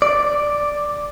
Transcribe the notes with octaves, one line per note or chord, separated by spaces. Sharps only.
D5